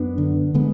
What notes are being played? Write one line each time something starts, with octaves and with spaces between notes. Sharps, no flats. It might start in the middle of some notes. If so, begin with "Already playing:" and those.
Already playing: F#2 B3 D4
D3
D3 G#3 B3